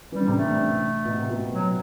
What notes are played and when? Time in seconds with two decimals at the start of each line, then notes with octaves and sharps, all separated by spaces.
0.12 E3 G3
0.20 D3
0.27 C3
0.34 D3 A3
1.05 B2
1.17 C3
1.30 B2
1.52 F#3